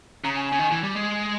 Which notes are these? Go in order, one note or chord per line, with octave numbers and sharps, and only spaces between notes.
C#3 A#5
G#5
C#3 G#5
D#3
E3
G3
G#3